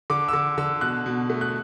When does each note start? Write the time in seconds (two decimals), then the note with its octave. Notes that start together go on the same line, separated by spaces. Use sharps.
0.10 D3 D6
0.28 E6
0.33 D3 D6
0.58 D3 E6
0.81 B2 F#6
1.06 B2
1.30 A3
1.41 F#6